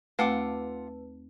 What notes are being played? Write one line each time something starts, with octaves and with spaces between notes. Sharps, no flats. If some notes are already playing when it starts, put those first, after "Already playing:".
D#2 A3 C4 F4 B4 F#5 A5 D6